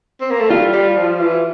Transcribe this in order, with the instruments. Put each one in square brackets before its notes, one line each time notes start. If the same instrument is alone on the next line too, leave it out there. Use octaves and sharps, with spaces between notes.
[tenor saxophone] C4
A#3
A3
[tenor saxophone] G3 [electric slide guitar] F4
[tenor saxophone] G3
F3
E3